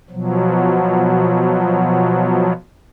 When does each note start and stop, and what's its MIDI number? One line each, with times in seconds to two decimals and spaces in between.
0.10 2.53 47
0.10 2.53 53
0.10 2.53 54